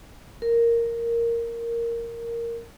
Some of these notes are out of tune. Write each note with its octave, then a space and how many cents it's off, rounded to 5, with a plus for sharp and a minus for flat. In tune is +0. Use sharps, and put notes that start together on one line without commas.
A#4 -5